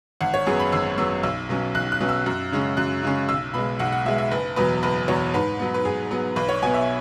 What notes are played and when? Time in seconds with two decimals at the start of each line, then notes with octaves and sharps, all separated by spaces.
0.21 G#1 F#5
0.34 C#5
0.46 F#2 F#3 B3 G#4
0.60 B5
0.72 G#1 E6
0.98 F#2 F#3 B3 E6
1.23 B1 E6
1.49 B2 F#3 C#4
1.75 B1 F#6
1.92 F#6
2.00 B2 F#3 C#4
2.09 E6
2.26 F#2
2.52 C#3 G#3 C#4
2.77 F#2 F#6
3.03 C#3 G#3 C#4
3.29 B1 E6
3.54 B2 G#3 B5
3.79 B1 F#5
3.92 F#5
4.05 B2 G#3 E5
4.18 E5
4.31 F#1 B4
4.56 E2 B2 F#3 B4
4.83 F#1 B4
5.08 E2 B2 F#3 C#5
5.34 G#2 B4
5.59 F#3 B3
5.74 B4
5.85 G#2 G#4
6.11 F#3 B3
6.36 B1 B4
6.49 C#5
6.62 B2 B3 G#5
6.74 E5